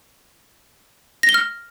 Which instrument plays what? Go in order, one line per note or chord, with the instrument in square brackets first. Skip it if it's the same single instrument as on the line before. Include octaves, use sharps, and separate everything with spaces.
[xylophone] A#6
G7
F6